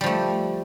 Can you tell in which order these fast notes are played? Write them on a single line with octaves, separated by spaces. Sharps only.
G3 F3 A3